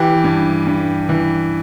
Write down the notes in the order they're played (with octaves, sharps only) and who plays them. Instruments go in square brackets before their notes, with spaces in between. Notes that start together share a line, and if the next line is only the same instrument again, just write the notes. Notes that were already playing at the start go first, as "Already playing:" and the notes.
Already playing: [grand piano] E3 G4
G2
G2
E3